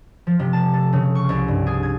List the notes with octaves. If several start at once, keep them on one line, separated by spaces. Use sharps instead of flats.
F3
C3
A5
A4
C#3
C#6
C2
G2
G#4
G#6